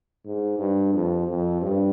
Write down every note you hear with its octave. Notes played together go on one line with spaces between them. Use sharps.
G#2
G2
F2
F2
G2